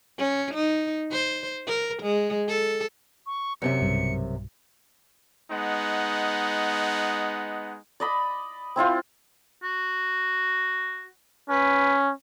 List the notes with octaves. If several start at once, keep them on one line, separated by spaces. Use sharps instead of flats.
C#4
D#4
C5
A#4
G#3
A4
C#6
F#2 C3 E5 C#7
B1 G2
G#3 B3 D#4 F#5
D5 D#5 B5
C4 E4 F4 C5
F#4
C#4 B4